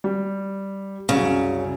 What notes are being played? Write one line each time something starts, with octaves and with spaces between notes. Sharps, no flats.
G3
C2 F#2 C#3